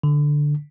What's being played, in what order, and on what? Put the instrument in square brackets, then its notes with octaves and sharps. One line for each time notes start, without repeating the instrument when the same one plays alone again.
[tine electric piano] D3